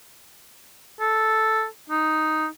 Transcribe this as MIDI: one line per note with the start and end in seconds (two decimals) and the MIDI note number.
1.01 1.66 69
1.90 2.47 63